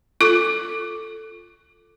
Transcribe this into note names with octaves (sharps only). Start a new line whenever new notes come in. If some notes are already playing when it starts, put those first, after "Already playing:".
F4 A4 D6